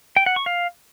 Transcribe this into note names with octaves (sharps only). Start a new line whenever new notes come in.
G5
F#5
C#6
F5